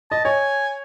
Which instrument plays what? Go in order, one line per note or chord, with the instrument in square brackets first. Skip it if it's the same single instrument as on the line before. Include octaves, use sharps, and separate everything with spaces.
[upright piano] D#5 [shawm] A5
[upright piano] C#5 [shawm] G#5